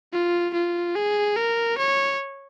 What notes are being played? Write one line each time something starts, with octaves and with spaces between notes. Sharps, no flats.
F4
F4
G#4
A#4
C#5